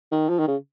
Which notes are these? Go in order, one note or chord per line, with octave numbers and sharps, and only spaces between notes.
D#3
F3
D#3
C#3